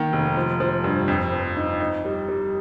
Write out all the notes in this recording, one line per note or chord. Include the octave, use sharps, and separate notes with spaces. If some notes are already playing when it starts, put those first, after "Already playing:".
Already playing: D#3 A#3
F1
F3
F3
G2
F2
F3
D#4
D#4
G3
G3